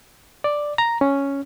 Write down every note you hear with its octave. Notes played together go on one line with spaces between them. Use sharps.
D5
A#5
C#4